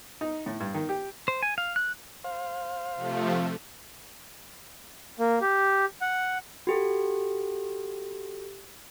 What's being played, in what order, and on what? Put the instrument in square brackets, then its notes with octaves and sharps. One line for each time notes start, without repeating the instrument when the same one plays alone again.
[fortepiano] D#4
A2
G2
D#3
G4
[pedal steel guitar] C5
G#5
F5
F#6
[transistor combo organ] C5 F5
[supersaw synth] C3 F3 A3
[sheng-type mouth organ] A#3
G4
F#5
[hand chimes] F#4 G4 A4